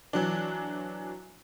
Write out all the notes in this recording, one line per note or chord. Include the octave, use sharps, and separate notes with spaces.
E3 F#3 D4